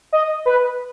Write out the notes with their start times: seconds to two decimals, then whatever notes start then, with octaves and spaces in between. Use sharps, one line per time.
0.13 D#5
0.46 B4